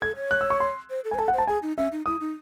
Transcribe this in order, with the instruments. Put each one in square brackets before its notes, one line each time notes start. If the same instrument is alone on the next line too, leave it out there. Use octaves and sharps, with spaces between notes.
[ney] A4 [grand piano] G#6
[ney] C#5
[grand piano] F#6
E6
C#6
C6
[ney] C5
A4
[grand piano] G#5
[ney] C5
[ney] A4 [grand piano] A5
[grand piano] F#5
[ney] C5
[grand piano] A5
[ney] G#4 [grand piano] G#5
[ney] D#4
[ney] C#4 [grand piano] E5
[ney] D#4
[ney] E4 [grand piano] D#6
[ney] D#4